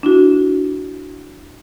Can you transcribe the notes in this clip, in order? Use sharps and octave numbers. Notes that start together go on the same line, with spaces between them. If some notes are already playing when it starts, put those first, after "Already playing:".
D4 E4 F#4